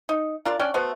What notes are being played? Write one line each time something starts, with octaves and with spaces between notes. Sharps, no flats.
D#4
D4 F4 A#4 D5
C#4 D4 D5 G5
A3 B3 F#4 C5